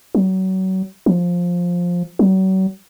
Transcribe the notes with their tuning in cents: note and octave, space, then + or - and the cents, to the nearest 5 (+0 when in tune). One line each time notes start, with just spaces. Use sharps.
F#3 +30
F3 +10
F#3 +40